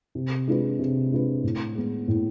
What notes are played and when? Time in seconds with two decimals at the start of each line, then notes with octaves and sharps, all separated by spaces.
0.15 C3
0.48 G#3 D4 F4 B4
0.79 C3
1.11 G#3 D4 F4 B4
1.43 A2
1.75 G#3 B3
2.08 A2